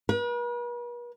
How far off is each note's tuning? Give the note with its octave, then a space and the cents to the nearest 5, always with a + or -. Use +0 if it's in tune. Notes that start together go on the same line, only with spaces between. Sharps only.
B4 -45